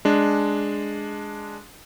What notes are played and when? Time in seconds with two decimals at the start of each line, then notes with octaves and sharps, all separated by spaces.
0.05 G#3 D4